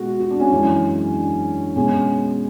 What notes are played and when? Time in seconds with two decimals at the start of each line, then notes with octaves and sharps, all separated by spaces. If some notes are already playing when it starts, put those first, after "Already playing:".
Already playing: B2 G#3 F#4
0.20 F#4
0.31 D4
0.40 C#4
0.51 F#2 E3 G#3
1.13 D4
1.76 B2 G#3 C#4